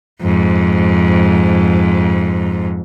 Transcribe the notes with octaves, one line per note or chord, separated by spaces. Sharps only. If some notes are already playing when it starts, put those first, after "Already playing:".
F2 G#2